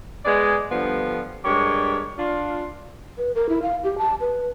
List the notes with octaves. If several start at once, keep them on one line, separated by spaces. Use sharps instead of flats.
G#3 B3 G#4 D5
G2 D3 F3 G3 B3
G2 G#3 G4 A#4 C#5
D4 F4
B4
A#4
E4
F5
G4
A5
B4